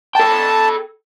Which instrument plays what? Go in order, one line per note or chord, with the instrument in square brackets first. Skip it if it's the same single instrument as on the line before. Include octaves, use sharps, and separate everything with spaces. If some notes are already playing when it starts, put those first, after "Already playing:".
[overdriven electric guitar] A4 G5 [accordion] A5